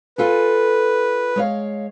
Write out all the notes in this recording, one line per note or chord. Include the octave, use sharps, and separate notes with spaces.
F4 A4 B4 G#5
G#3 C#5 F5